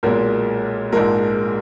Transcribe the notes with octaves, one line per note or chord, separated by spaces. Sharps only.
B1 A#2 G#3 A#4
A#1 G#2 F3 G#3 A#4